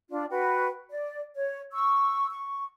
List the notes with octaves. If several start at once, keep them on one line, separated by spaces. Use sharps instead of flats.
D4 F4
F#4 B4 G5
D5
C#5
C#6 E6
C#6